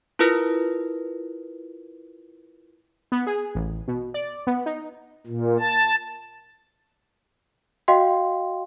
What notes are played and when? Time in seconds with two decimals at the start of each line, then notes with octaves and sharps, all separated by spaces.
0.19 E4 F4 A#4 B4 F6 A#6
3.12 B3
3.27 G#4
3.55 A1
3.88 B2
4.14 D5
4.47 B3
4.66 D#4
5.27 A#2
5.60 A5
7.88 F#4 D#5 F5 G5 C6